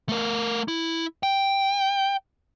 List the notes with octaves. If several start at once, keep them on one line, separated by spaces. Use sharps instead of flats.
A3 A#4
E4
G5